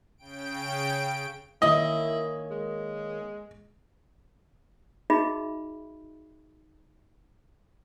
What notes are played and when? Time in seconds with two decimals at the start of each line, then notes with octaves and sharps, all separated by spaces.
0.18 C#3 G5 D7
1.62 D#3 A#3 C#4 E4 D#5
2.50 G#3
5.10 D#4 F#4 G#4 D#5 E5 B5